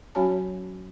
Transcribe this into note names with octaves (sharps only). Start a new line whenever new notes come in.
F#3 C#4 F#4 C#5 G#5 A5